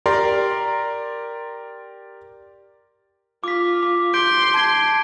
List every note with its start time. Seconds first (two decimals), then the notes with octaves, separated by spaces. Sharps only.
0.06 G4 A#4 D5 A#5 C6
3.44 F4 D6 B6
3.83 D6
4.14 C6 D6 G6 D7
4.54 A5 G#6 D7